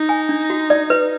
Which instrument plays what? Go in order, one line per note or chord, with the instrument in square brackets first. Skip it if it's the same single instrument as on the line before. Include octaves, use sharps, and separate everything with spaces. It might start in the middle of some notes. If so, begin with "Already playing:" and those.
Already playing: [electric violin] D#4
[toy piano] G#5
D4
F#4
D5
B4